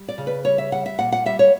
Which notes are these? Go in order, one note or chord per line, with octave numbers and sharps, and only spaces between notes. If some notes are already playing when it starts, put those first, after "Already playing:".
Already playing: G3
D5
C#3
B4
G3 C#5
E5
G3 F#5
E5
A#2 F#5
F#5
G3 E5
C#5